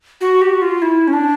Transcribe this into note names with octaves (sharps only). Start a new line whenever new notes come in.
F#4
G4
F#4
F4
E4
C#4
D4